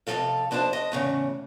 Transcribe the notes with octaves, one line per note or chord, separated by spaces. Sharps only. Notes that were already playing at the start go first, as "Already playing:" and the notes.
F2 C3 F3 G#3 A4 F5
F2 D4 E4 C5 A5
D#5
E2 A2 C#3